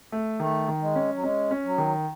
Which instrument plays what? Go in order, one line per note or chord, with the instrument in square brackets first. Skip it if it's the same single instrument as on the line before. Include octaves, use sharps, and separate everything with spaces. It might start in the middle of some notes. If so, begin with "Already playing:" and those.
[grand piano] A3
[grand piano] D#3 [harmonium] A3
[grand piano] D#3
[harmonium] G#3
[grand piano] C#4
[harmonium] F#3
[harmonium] G#3 [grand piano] C#4
[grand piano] C#4
[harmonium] F#3
[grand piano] D#3